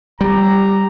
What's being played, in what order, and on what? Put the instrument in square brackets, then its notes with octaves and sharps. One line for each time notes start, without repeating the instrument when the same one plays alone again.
[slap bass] G3 [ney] G4 [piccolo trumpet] A#5